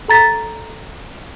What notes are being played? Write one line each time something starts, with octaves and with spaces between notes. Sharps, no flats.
A4 A#5 A6 B6